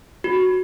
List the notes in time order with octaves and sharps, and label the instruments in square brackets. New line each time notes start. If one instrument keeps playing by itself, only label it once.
[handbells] F#4